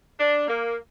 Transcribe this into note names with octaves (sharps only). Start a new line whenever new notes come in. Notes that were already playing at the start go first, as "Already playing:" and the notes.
D4
A#3